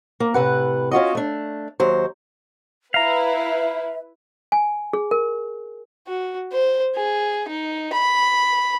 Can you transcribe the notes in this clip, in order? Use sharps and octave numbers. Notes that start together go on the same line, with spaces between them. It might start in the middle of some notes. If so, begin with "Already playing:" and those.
A#3
A2 C3 B4 F#5
C#4 F4 F#4 D#5
A3 D4
D#2 F#3 C5
E4 B4 E5 F5 A#5
G#5
G#4
A#4
F#4
C5
G#4
D#4
B5